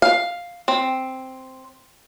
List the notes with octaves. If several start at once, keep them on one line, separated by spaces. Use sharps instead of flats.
F5
C4